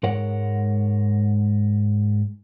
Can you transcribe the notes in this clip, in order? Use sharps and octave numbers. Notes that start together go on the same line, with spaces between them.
G#2 G#3 A#4 C#5 F#5